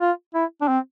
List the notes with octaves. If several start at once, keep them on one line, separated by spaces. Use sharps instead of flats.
F4
E4
D4
C4